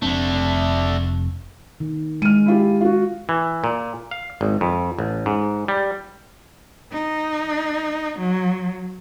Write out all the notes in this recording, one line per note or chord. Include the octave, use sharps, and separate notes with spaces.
F1 D3 A3 C4 D4
D#3
G#3 F6 D#7
E4 F4 G4
F4 F#4
E3
A#2
F5
G#1
F2
A1
G#2
G3
D#4
F#3